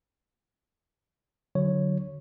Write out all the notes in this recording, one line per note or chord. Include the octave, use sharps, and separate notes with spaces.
D3 F#3 C#5